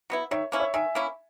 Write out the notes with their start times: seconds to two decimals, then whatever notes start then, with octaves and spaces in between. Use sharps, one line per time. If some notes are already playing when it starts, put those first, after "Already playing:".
0.10 F#3 B3 E4
0.31 D#3 C#5 E5
0.52 A#3 C#4 E4
0.60 C#5 E5
0.74 D#3 E5 G#5
0.95 A#3 C#4 E4